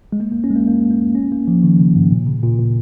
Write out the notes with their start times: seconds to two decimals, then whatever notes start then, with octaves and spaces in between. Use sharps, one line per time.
0.12 G#3
0.20 A#3
0.32 A#3
0.44 C#4
0.51 G#3
0.56 A#3
0.67 A#3
0.91 A#3
1.15 C#4
1.32 A#3
1.48 F3
1.63 D#3
1.80 C#3
1.96 G#2
2.11 A#2
2.27 C#3
2.43 A#2
2.59 A#2